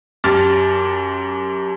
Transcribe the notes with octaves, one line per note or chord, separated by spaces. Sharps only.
F#2 G4 A5 D6 F6 A6